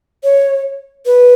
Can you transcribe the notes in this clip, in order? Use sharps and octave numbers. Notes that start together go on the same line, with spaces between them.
C#5
B4